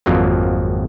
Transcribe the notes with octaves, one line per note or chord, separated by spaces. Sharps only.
G#1 F2 F3 F#3 A#3